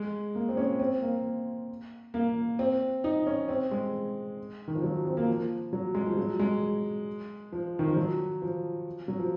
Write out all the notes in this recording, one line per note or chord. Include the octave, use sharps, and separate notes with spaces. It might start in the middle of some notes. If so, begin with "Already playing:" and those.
Already playing: G#3
A#3
C4
C#4
C4
A#3
A#3
C4
D#4
C#4
C4
G#3
D#3
F3
F#3
C4
A#3
F3
F#3
G#3
F3
F#3
G#3
F3
D#3
F3
F#3
F3
F#3
F3